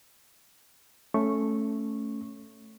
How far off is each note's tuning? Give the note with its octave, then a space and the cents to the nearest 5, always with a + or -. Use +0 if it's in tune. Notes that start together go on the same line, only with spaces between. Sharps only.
A3 +0 C#4 +0 C#6 -10